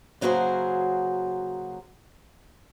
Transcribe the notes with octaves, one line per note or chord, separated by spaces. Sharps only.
C#3 F#3 A#3 F#4 G#4 C5